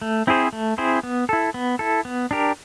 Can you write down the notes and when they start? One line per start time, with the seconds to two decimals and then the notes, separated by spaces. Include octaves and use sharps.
0.02 A3
0.27 C4 E4 G#4 C5
0.53 A3
0.78 C4 E4 G#4 C5
1.03 B3
1.29 E4 A4
1.54 B3
1.79 E4 A4
2.05 B3
2.31 D4 G4 A#4